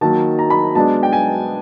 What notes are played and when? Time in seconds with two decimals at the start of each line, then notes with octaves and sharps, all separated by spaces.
0.01 D#3 F#3 A#3 A5
0.39 A#5
0.50 B5
0.75 B2 G#3 B3 D4 A5
1.03 G5
1.13 G#5